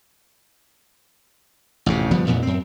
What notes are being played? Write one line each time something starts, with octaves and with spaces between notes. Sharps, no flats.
A1 F2 C3
G1 F3 G3 B3
A1 F2 A#2 B3
F#2 C4